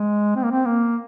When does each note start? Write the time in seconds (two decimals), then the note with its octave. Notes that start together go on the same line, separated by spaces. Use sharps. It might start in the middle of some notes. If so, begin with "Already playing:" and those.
Already playing: G#3
0.36 C4
0.44 A#3
0.51 C4
0.65 A#3